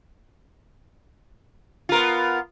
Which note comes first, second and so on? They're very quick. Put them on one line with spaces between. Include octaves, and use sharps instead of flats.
F4 A#4 B3